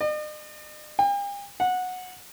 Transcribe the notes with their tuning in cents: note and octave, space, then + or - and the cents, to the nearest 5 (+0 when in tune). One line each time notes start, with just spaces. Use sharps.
D#5 -45
G5 +45
F#5 -15